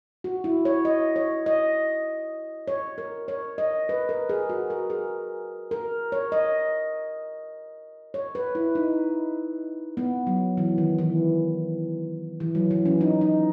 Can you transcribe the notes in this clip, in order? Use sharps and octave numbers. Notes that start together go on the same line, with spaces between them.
F#4
E4
C#5
D#5
C#5
D#5
C#5
A#4
C#5
D#5
B4
A#4
G#4
F#4
A#4
G#4
A#4
C#5
D#5
C#5
B4
E4
D#4
B3
F#3
E3
D#3
E3
E3
F#3
E3
C#4
D#4
D#4